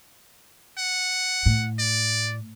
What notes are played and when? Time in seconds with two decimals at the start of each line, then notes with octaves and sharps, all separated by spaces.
0.78 F#5
1.46 A2
1.79 D5